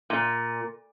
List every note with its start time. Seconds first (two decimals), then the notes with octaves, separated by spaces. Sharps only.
0.10 A#2